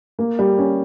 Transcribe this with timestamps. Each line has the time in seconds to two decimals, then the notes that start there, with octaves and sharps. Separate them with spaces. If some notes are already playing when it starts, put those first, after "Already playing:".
0.19 A#3
0.39 G3
0.59 C#4